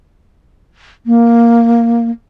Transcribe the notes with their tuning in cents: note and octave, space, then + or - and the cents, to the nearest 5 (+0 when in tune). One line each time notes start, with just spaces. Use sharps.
A#3 +0